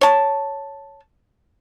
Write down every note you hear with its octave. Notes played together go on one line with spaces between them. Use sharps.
C#5 A5